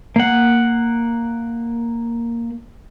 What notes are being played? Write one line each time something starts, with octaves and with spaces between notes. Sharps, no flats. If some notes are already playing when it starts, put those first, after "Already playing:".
A#3 F#5